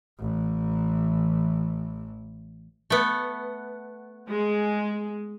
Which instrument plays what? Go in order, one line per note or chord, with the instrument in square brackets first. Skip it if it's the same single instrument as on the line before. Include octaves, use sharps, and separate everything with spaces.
[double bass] A1 E3
[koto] A3 B3
[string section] G#3